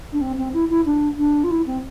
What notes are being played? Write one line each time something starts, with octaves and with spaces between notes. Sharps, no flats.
D4
C4
C4
E4
E4
D4
D4
F4
E4
C4